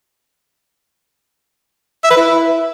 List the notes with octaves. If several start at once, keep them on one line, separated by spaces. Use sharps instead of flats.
E5
B4
E4